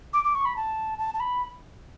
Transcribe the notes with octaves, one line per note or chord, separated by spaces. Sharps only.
D6
D6
C#6
B5
A5
A5
A5
B5